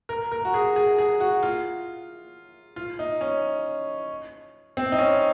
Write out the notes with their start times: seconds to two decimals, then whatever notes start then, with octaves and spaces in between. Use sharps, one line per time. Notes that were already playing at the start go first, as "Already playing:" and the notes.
0.09 A#4
0.32 A#4
0.45 F#4
0.54 G#4
0.76 G#4
0.99 G#4
1.20 F#4
1.43 F4
2.76 F4
2.99 D#4
3.21 C#4
4.77 C4
4.92 D#4
4.99 C#4